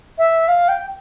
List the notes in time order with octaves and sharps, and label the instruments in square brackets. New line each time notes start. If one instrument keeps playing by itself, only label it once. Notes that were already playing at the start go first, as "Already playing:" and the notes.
[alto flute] E5
F5
G5